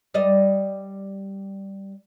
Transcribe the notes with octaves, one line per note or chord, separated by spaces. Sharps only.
G3 D5 D#5